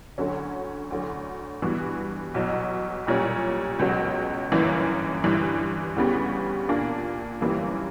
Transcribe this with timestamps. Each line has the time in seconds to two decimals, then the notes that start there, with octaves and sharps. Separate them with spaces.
0.18 D2 D3 F#3 C#4
0.91 D2 D3 F#3
1.62 G2 E3 B3 F#4
2.34 B1 B2 F#3
3.07 B1 A#2 G3 C#4
3.79 C#2 B2 F#3
4.51 G1 F#2 E3 A#3
5.24 G1 G2 E3
5.96 D2 C#3 G3 B3
6.69 A#2 A#3 D4
7.41 G1 F#2 E3 G3 A#3